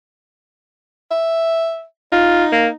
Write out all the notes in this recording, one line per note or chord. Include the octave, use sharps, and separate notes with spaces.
E5
D#4 F4
A#3